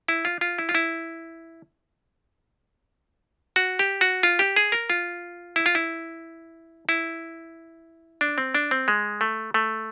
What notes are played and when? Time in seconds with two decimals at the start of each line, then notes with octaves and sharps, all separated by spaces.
0.08 E4
0.25 F4
0.41 F4
0.58 E4
0.69 F4
0.75 E4
3.56 F#4
3.79 G4
4.01 F#4
4.23 F4
4.39 G4
4.56 G#4
4.72 A#4
4.90 F4
5.56 E4
5.66 F4
5.75 E4
6.89 E4
8.21 D4
8.38 C4
8.55 D4
8.71 C4
8.88 G#3
9.21 A3
9.54 A3